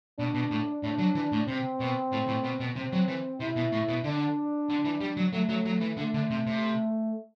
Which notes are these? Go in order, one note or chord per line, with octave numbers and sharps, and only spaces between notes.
B2 D4
B2
A2
A2 D4
F#3
E3
A2
C3 C4
B2
A2
A2
B2
B2
C3 C4
F#3
E3
C3 E4
B2
A2
B2
D3 D4
D3
E3
G3
F#3
F#3 A3
F#3
F#3
E3
D3 A3
D3
C3
C3